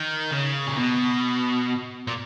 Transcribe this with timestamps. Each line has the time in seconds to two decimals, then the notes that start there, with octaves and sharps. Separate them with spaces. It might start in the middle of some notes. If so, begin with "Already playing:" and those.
Already playing: D#3
0.31 C#3
0.67 A#2
0.77 B2
2.07 A#2